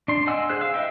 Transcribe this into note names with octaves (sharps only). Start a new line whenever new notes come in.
D4 C6
D#5 F#5 G#5 E6
G#4 C5 F#6
F5 E6
E4 C5 D#5 E5 G5